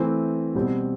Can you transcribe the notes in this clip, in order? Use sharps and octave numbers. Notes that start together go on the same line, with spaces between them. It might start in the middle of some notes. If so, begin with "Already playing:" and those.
Already playing: E3 A3 C4
B2 G3 C4